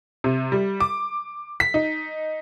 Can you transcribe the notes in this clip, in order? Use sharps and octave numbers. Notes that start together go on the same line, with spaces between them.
C3
G3
D6
B6
D#4